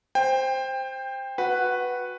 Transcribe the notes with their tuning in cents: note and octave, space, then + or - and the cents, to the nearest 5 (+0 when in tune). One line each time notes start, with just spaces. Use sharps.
C5 +0 G5 +20
F#4 -20 B4 +0 F#5 +0